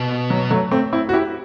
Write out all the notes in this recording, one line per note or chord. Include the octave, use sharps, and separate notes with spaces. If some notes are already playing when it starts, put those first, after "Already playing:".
Already playing: B2
F#3
F#3 A3
A3 C4
C4 E4
F#4
E4 G4